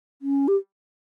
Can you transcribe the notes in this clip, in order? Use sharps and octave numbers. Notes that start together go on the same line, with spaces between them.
C#4
G4